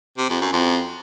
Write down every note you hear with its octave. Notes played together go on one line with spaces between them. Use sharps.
C3
F2
F#2
F2